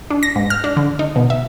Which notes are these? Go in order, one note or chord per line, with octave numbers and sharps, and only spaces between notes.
D4
A#6
G#2
F6
D4
D3
D#4
B2
E5